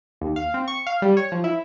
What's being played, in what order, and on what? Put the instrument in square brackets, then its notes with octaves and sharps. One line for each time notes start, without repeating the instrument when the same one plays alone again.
[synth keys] D#2
F5
C4
C#6
F5
G3
C#5
F3
E4